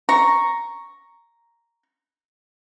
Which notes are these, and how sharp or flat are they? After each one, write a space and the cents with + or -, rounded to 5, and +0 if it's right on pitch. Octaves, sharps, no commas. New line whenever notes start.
A#5 +0 C#6 +0